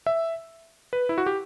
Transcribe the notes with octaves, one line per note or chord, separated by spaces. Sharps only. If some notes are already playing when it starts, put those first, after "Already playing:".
E5
B4
E4
F#4
G4